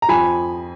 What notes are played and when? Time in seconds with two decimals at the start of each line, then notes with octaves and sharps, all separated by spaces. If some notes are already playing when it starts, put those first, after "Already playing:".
0.02 A#5
0.09 F2 F3 G#5 B5